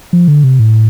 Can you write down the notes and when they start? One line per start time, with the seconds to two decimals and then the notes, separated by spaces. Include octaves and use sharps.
0.13 F3
0.28 D3
0.44 C3
0.59 A2